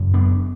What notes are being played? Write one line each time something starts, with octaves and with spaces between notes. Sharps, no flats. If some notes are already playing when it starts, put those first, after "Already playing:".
Already playing: F#2 C#3
B3 D4